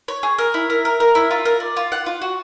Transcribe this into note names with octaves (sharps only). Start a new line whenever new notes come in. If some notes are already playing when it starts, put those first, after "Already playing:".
C#5
G#4
A#4
E4
A#4
A#4
A#4
E4
F4
A#4
D5
F4
F#5
F4
F#4